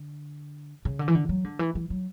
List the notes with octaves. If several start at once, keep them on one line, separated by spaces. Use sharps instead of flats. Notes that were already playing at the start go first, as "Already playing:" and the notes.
Already playing: D3
C#3
D3
E3
D3
F#3
D3
E3
E3
F#3